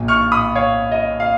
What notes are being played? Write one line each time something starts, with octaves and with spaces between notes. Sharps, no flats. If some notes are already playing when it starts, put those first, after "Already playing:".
Already playing: A#1 A#2
C#6 F6
B5 D#6
C#5 F5
D#5
F5